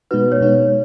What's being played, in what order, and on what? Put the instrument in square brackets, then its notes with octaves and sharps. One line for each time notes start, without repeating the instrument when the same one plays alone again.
[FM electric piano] B2 G#3 D#4 F#4 [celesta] B4
[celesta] C#5
[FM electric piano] B2 G#3 D#4 F#4